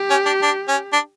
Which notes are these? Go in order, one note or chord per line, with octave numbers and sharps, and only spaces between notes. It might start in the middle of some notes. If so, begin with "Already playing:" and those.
Already playing: G4
C#4
D4
D4
C#4
D4